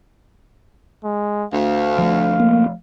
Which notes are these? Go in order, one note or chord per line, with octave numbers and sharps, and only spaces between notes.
G#3
D2 F5
F3 A3
A#3